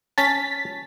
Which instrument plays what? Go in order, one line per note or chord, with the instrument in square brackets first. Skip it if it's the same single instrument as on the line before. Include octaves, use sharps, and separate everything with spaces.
[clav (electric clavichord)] C#4 A5 [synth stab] A6 B6